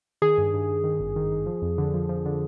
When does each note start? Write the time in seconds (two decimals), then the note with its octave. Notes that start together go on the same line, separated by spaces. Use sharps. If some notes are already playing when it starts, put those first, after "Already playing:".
0.22 D#3 G#4
0.38 G2
0.54 G2
0.68 G2
0.84 D#3
1.00 G#1
1.16 D#3
1.32 D#3
1.46 F3
1.62 F2
1.78 D3
1.94 F3
2.09 F3
2.26 D3